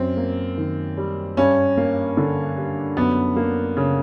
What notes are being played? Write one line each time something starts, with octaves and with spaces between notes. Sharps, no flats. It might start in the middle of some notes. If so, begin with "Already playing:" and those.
Already playing: F#2 C4
A#3
D#3
G3
G2 C#4
A#3
D3
G3
F#2 B3
A#3
C#3